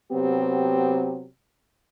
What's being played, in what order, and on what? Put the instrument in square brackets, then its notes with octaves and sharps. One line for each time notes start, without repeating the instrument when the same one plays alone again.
[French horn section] C3 F#3 B3 C4 G4